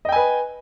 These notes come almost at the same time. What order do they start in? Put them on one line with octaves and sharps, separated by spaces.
D#5 G5 G#5 B4